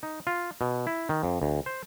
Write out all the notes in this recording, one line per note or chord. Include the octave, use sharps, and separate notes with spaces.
D#4
F4
B2
E4
D#3
F2
D2
C5